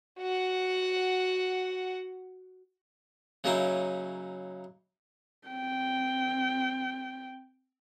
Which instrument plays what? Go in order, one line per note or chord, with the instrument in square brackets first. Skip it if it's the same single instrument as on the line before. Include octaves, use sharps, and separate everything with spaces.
[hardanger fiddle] F#4 F#5
[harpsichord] C#3 F#3 A#3 C#4 D#4 E4
[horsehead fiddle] C4 G5